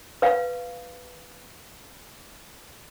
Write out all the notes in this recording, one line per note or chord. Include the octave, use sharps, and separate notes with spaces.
B4 F5